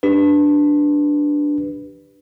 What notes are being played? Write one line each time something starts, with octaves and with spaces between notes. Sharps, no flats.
D4 G4 B4